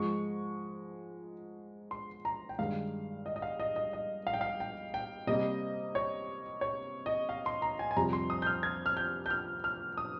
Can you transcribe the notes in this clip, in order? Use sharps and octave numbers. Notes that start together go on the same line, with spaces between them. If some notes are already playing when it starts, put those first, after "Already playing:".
Already playing: G#2 F3 G#3 C#6
C6
A#5
G5
G2 D#3 G#3 F5
D#5
D#5
F5
D#5
D#5
D#5
F5
G5
F5
G5
G5
C3 G3 A#3 D#5
C#5
C#5
D#5
F5
C6
A#5
G#5
G#5
F2 C3 G3 A#5
C6
D#6
G6
F6
G#6
F6
G6
G6
F6
F6
D#6